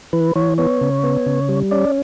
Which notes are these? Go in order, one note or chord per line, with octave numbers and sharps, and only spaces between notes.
E3 B4
E3 C#5
B3 C#5
C#3
B3
C#3
G3
C#4 D5